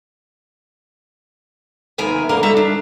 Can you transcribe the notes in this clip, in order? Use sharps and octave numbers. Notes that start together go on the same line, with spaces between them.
D#2 C3 B3 A#4 E5 G#5
F#2 D3 A#3 A#4
G3 F#4 A4 D#5 E5 A#5
D4